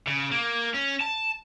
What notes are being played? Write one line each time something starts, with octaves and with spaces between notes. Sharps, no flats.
C#3
A#3
C#4
A5